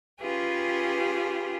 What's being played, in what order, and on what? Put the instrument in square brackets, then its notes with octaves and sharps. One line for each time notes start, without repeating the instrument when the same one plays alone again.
[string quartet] C#4 F4 G4 G#4 B4